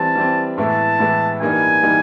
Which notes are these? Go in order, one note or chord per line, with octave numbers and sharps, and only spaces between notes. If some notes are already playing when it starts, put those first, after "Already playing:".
Already playing: E3 G3 C4 A5
E3 G3 C4
A2 E3 G#3 B3 E4 A5
A2 E3 G#3 B3 E4
G2 E3 G3 A#3 D#4 G#5
E3 G3 A#3 D#4